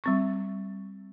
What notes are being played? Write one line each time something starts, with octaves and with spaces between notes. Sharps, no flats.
G3 C4 C#6